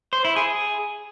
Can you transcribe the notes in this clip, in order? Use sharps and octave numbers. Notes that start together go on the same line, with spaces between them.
C5
E4
G#4